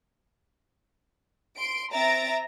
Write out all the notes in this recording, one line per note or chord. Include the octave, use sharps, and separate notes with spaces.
C6 D7
C4 E5 A#5 A6 A#6 D7